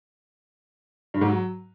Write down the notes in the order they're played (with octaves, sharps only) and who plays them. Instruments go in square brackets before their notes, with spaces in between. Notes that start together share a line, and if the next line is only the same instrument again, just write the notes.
[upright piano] G2
G#2
F#3